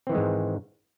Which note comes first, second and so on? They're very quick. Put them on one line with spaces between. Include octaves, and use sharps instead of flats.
C4 E3 D#3 G#3 G#2